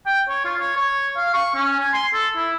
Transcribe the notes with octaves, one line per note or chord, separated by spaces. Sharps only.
G5
C#5
F4
C#5
C#5
F5
C#6
C#4
G#5
C6
A4
E4